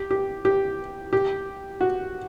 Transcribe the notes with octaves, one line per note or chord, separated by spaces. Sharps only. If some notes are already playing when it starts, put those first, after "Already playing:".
Already playing: G4
G4
G4
G4
F#4